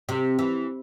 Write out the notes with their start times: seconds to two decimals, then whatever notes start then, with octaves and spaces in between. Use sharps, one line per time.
0.09 C3
0.39 E3